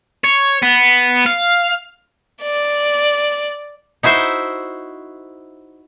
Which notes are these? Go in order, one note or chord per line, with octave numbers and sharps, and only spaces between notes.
C#5
B3
F5
D5
D#4 E4 F#4 C5 E5